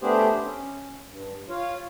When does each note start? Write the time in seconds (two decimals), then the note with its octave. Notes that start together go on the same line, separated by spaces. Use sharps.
0.02 A3 B3 D4 G4 G#4 C5
0.44 C#4
1.08 G2
1.49 F4 C#5 F5